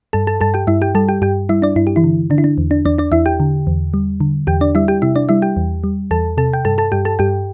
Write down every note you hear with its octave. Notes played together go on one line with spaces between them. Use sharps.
G2 A4 A5
A4 A5
G2 A4 A5
G4 G5
G2 E4 E5
G4 G5
G3 A4 A5
G4 G5
G2 G4 G5
G3 E4 E5
D4 D5
G2 E4
G4
E3 E4
D3
D3 D4
E4
D4
E2
D4
E2 D4 D5
D4 D5
E2 E4 E5
G4 G5
D3
E2
G3
D3
E2 G4 G5
D4 D5
G3 E4 E5
G4 G5
C3 E4 E5
D4 D5
G3 E4 E5
G4 G5
E2
G3
E2 A4 A5
C3 A4 A5
G5
G2 A4 A5
A4 A5
G2 G4 G5
A4 A5
G2 G4 G5